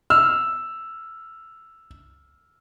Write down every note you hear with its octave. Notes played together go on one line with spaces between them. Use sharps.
E6 F6